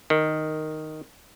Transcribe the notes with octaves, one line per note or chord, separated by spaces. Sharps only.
D#3